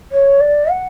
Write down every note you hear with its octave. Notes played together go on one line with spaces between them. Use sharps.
C#5
D5
F#5